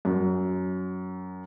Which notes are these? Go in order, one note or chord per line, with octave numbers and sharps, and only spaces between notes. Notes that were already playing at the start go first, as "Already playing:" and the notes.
F#2